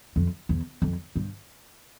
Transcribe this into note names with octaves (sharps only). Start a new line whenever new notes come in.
F2
E2
F2
G2